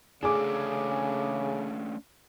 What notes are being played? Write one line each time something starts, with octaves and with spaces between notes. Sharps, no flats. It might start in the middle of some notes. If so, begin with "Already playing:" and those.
C#3 A3 C#4 D4 G#4 D6